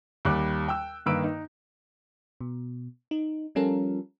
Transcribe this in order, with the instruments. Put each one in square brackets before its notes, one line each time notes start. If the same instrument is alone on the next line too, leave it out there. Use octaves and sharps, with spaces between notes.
[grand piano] D#2 G3 D6 F#6
G5 E6
G2 D#3 A#3 B4 E6 D7
D#4
[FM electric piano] B2
D#4
F3 G3 C#4 F4 A4 A#4